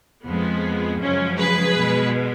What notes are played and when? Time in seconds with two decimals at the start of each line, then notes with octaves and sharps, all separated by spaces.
0.25 F2 F3 G#3 B3
1.00 F#2 C#3 F3 G#3 C#4
1.38 G#4 B4
1.76 B2 G#3